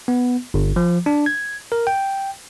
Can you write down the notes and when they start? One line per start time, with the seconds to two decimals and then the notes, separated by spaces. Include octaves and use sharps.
0.08 B3
0.54 G1
0.76 F3
1.06 D4
1.26 G#6
1.72 A#4
1.87 G5